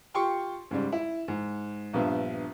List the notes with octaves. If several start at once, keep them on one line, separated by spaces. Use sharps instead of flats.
F4 G4 G5 C6 C#6
G#2 C#3 G3
E4
G#2
A#1 G2 B3 E5